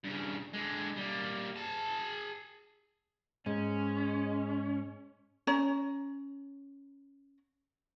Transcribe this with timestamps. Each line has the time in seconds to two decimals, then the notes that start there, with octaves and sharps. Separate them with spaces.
0.04 G2 C#3
0.53 D3 G#3
0.97 G3 A#3
1.56 G#4 A5
3.46 G#2 G#3 C#4
5.47 C#4 C#5 A#5